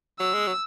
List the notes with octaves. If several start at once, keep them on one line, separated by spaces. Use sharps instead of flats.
F#3 E6
G#3
F#3